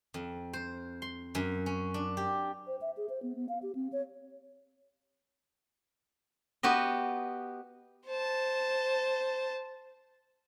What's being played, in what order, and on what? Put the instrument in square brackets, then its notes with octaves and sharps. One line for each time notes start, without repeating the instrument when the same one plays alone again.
[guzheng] F2
C5
C6
F#2
C#4
D4
G4
[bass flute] C5
E5
G#4
C5
B3
B3
F5
G4
C4
C#5
[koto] B3 F#4 G4 B4 D#5
[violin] C5 A5